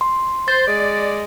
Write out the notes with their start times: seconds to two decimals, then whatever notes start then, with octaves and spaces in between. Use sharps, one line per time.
0.01 C6
0.48 C5 A6
0.68 G#3 D5